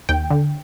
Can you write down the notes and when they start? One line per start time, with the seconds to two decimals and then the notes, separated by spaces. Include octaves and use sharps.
0.09 D#2 G5
0.31 D3